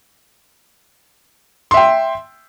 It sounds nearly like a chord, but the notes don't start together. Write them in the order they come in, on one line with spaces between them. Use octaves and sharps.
C6 E5 G5